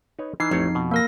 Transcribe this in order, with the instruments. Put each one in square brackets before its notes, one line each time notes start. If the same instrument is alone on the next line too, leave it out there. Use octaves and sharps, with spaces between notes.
[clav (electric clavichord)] D#4 B4 C#5
[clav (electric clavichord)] E3 [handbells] D#4 C7
[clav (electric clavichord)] A1 A3 C#5 [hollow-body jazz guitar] F2
[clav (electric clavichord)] B2
[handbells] A#3 A#4 A#6